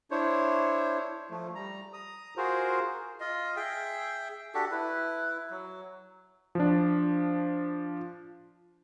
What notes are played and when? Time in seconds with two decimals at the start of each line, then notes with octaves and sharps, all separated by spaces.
0.11 D4 E4 C5 C#5
1.30 F3 A3
1.55 G3 A#5
1.93 A#5 D#6
2.37 F4 F#4 G#4 A#4 C5
3.20 F4 D#5
3.57 G#4 E5 G5
4.54 D4 F#4 G4 A4
4.71 E4 B4
5.50 F#3
6.55 F3 D4